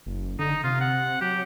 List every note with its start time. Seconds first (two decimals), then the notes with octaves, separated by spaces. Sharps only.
0.06 F#1
0.39 D3 D#4
0.64 C3 F4
0.81 F#5
1.21 F#3 G4